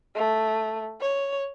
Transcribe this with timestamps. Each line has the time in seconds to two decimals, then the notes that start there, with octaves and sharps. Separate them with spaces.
0.15 A3
1.01 C#5